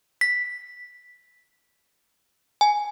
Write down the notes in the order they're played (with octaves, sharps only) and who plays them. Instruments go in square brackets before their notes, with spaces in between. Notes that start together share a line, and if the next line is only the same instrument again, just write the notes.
[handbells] B6
G#5